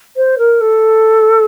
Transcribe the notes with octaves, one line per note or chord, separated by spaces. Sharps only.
C5
A#4
A4